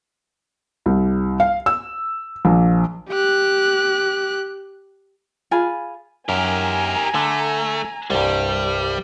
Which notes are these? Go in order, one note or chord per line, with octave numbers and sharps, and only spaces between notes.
C2
F5
E6
A#1
G4 F#6
F4 G#4 G#5 B5
F#2 G4 A#4 G#5 A#5
D3 A3
C2 G2 G3